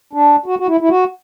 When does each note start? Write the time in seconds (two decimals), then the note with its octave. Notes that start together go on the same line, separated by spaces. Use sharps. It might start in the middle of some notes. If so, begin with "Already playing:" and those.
0.13 D4
0.46 F#4
0.59 F#4
0.67 E4
0.81 E4
0.89 F#4